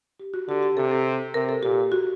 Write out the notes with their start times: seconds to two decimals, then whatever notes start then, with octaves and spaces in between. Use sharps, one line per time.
0.20 G4
0.34 F#4
0.48 D3 G4
0.62 G4
0.77 C3 A4
0.91 A4
1.34 C3 A#4
1.49 A4
1.62 A#2 G4
1.92 F#4